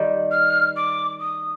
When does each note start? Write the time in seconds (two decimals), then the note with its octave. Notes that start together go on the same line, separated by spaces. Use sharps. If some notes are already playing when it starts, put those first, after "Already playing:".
Already playing: D#3 G3
0.31 F6
0.76 D6
1.20 D#6